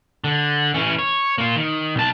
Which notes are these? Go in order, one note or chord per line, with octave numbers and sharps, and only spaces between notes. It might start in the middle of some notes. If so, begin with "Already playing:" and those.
D3
E3 C#4
C#5
A#3 F4
D#3
B1 A5